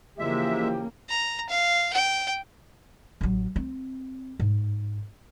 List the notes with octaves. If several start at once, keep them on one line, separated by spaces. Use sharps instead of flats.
C#3 E3 F3 G#3 A#3 G4 E5
A#5
F5
G5
A1 F#3
C4
G#2